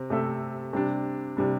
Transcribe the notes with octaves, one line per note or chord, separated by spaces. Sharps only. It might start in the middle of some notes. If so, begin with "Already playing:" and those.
Already playing: C3 C4
C3 A3 C4 A4 E5
C3 G3 D4
C3 G3 D4